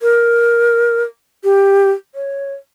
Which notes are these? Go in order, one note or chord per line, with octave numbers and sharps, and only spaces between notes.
A#4
G4
C#5